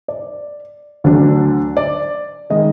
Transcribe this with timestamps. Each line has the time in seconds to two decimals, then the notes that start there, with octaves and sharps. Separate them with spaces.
0.08 D5
1.04 D2 D3 F#3 D4
1.77 D5
2.50 D#3 G#3 D#5